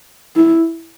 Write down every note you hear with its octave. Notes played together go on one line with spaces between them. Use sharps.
E4